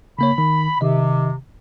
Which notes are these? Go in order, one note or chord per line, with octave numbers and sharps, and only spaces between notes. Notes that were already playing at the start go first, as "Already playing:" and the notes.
C#3 A#3 C#5 B5
D#3
C3 D#3 D#5